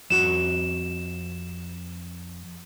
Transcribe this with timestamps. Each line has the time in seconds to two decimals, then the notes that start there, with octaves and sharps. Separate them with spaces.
0.10 F2 F#4 F#5 E7